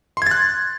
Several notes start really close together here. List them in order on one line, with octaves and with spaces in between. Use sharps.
C6 G#6 A6 F#6